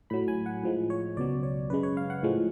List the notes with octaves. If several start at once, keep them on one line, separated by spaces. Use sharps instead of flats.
A2 F#3 B5
G#5
F#5
A2 F3 G#3
C#5
C#2 B2 F#3 D5
C#5
F#2 C#3 G#3 B4
C#5
F5
F#5
A2 F3 G#3